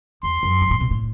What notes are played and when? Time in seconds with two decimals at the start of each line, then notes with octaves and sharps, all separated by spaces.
0.23 E2 C6
0.43 F#2
0.61 G2
0.70 A2
0.81 B2
0.91 A2